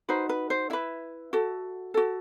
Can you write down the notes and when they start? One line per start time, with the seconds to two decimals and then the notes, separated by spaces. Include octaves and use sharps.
0.09 D#4 F#4 B4 C5
0.29 B4
0.50 C5
0.70 E4 B4 E5
1.33 F#4 A4
1.94 F#4 A4